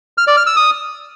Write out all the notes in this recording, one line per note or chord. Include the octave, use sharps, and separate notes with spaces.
F6
D5
F6
E6
D#6